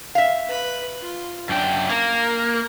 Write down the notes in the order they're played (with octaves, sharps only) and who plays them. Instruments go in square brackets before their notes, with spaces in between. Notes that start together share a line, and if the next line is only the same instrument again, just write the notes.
[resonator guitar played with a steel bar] E5 F5
[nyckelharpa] B4 B5
F4
[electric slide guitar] F#2 G5 [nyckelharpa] D4
[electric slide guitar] A#3 [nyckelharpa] A#4